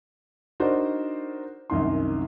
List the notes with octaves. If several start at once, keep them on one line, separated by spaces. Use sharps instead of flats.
D4 D#4 F#4 A#4 C5
C2 F#2 D#3 C6